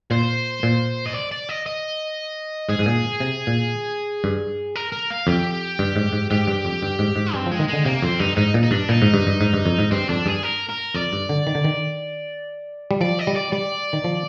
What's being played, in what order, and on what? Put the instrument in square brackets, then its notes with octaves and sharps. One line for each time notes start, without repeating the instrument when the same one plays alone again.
[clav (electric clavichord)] A#2 [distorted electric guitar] C5
[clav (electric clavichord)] A#2
[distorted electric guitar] D#5
D5
D5
D#5
D#5
[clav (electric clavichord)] G#2 [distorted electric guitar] G#4
[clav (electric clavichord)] G#2
A#2
C3
A#2
G2
[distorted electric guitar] A#4
A#4
F5
[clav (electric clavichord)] F2 [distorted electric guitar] G4
[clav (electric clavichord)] G2
G#2
G#2
[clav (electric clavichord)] G#2 [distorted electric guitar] G4
[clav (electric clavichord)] G2
F2
G2
G#2
G#2
[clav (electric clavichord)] G2 [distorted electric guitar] C4
[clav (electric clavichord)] F3 [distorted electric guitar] G#3
[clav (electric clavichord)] D#3
[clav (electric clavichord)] D3 [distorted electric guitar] G#3
[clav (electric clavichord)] C3 [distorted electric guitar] A#3
[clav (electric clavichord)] F2 [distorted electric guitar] C4
[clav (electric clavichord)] G2 [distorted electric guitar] D#4
[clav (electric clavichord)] G#2 [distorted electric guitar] D#4
[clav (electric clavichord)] A#2
[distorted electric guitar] D#4
[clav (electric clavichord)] G2 [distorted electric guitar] D4
[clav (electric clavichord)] A#2 [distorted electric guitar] D#4
[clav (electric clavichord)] G#2
G2
G2
G#2
G2
F2
G#2
[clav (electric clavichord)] G2 [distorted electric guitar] C4
[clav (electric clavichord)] F2 [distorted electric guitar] D4
[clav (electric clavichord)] G2 [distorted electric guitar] G#4
[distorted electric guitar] A#4
A#4
[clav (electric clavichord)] F2 [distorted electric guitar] D5
[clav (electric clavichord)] G2
D3
D#3
D3
D#3
G3
[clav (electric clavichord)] F3 [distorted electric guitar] D5
[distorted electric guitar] D#5
[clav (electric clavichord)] G3
[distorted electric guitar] D5
[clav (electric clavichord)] G3 [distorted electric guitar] D5
[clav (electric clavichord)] D#3
F3